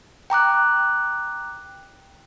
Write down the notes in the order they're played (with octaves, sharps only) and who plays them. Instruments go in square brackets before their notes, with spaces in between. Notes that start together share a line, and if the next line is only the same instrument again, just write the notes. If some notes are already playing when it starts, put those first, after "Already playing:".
[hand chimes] G5 A#5 D6 F#6